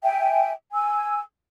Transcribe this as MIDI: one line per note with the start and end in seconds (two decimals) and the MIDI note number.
0.03 0.51 76
0.03 0.51 79
0.03 0.51 80
0.73 1.19 80
0.73 1.19 88